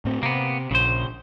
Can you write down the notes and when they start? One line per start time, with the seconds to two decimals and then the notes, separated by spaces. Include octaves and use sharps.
0.05 A2 C4
0.23 C3 A#3 B3
0.71 A#1 C#3 C5